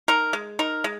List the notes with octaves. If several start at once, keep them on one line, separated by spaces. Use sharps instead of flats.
D#4 A#4
G#3
D#4 A#4
G#3